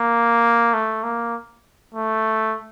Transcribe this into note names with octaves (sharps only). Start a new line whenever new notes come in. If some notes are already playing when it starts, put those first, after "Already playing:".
Already playing: A#3
A3
A#3
A3